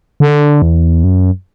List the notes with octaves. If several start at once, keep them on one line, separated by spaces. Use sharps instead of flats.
D3
E2
F#2